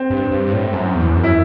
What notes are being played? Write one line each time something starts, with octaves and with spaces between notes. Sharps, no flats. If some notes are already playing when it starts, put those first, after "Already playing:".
Already playing: C4
G2
G2
A2
F#2
E2
F#2
E4